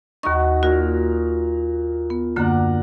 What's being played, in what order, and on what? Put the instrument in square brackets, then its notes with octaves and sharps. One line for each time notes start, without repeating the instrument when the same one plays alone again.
[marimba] D#2 C#6 [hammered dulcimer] D#4 F#4
[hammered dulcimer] A#2 A#4 [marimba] F#4
[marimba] B3
[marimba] F#2 D3 A#3 [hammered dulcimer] D4 A#4 F#5